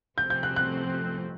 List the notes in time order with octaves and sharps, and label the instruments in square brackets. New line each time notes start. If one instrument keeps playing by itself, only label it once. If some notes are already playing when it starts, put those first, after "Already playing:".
[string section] C3 F3 A3 C4 [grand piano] G6
[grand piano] G6
F#6
F#6